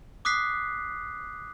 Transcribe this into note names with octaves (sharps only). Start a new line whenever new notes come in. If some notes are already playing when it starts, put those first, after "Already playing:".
D6 D#6 F#6 B6 C7